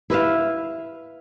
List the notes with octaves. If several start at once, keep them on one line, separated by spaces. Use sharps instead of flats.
E4 B4 E5 F5